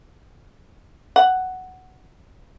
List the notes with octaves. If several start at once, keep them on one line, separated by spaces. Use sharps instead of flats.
F#5